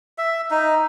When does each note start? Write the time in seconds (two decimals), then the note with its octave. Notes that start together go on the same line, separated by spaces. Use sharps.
0.18 E5
0.51 D#4